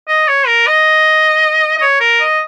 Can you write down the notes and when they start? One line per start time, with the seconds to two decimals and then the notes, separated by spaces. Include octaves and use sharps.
0.08 D#5
0.28 C#5
0.47 A#4
0.67 D#5
1.78 D#5
1.81 C#5
2.01 A#4
2.21 D#5